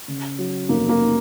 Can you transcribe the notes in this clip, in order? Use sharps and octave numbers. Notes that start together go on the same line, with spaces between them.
C#3
F#3
F1 A#3
A#3